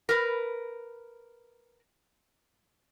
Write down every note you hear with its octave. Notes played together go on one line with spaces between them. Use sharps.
A#4 B4